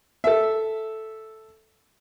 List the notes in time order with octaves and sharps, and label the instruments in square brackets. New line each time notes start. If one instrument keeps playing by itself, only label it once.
[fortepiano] A4 E5